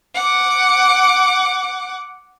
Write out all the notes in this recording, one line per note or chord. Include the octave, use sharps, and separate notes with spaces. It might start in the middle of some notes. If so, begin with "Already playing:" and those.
F#5 D6